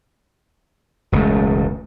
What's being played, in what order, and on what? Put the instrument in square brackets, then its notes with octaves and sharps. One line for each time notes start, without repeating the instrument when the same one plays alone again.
[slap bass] E1 C#2 F#2 A3